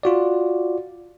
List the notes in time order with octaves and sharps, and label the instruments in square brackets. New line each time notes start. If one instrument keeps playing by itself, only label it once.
[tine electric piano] F4 F#4 D5